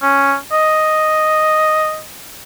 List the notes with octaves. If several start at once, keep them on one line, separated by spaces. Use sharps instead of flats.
C#4
D#5